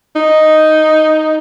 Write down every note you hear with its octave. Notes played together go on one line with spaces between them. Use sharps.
D#4